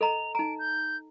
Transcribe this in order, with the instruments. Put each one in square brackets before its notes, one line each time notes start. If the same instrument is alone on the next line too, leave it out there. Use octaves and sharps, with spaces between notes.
[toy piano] A4 D#5 A#5 [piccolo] F7
[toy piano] D#4 A#5 [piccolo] D7
[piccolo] G6